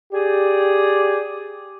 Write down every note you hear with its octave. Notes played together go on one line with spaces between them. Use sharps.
G4 G#4 D5